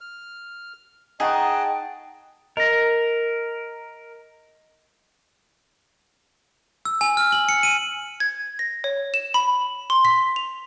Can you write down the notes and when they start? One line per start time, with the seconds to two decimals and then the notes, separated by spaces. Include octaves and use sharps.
0.01 F6
1.20 D#4 G#4 D#5 F#5 G5 A5 C#6
2.57 A#4 D#5 A#6
6.85 E6
7.01 G#5
7.17 F6
7.32 F#7
7.49 C#7
7.63 D#7
8.20 G#6
8.59 A#6
8.84 C#5
9.14 E7
9.34 B5
9.90 C6
10.05 B6
10.36 F7